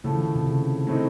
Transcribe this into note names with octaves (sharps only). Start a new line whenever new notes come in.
A2 C#3 F3 A3
D#3
C#3
C3
C#3
A2 A3 C4 D#4